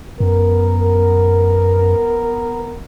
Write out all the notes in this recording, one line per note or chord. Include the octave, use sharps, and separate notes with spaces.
F#2 B3 A#4